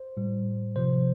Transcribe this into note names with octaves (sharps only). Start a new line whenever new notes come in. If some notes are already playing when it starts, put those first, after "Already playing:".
Already playing: C5
A2 G3
C3 F3 C5